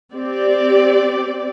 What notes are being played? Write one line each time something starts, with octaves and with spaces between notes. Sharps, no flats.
C4 G4 D5